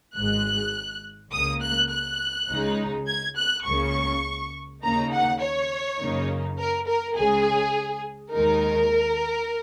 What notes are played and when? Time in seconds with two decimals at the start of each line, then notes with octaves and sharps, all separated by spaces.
0.16 G#1 G#2 G#3 F#6
1.33 C#2 C#3 A#3 D#6
1.63 F#6
1.91 F#6
2.50 C#2 C#3 G#3 D#4
3.08 G#6
3.38 F#6
3.67 C#2 C#3 A#3 C#6
4.84 D#2 C#3 A#3 D#4 A#5
5.14 F#5
5.42 C#5
6.00 F#2 C#3 A#3 D#4
6.59 A#4
6.88 A#4
7.17 C#2 C#3 G#3 G#4
8.34 D#2 D#3 G#3 D#4 A#4